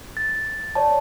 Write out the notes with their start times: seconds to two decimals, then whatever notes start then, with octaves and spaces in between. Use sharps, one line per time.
0.17 A6
0.75 C#5 D5 A5